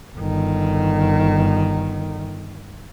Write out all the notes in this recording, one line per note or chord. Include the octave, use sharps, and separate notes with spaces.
G1 D#3